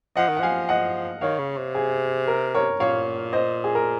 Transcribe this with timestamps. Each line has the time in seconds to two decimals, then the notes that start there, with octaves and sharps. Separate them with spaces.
0.16 F3 D#5 F#5
0.29 D#3
0.37 F#5
0.40 F3 F5 G#5
0.69 D#5 F#5
1.21 D#3 C#5 F5
1.39 C#3
1.57 C3
1.75 G#4
2.28 A#4
2.55 A#4 C#5
2.80 A#2 C#5 F5
3.33 C5 D#5
3.64 G#4
3.75 A#4